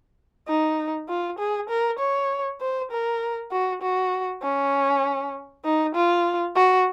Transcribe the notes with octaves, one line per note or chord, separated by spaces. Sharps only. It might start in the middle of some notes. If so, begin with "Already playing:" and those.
D#4
F4
G#4
A#4
C#5
C5
A#4
F#4
F#4
C#4
D#4
F4
F#4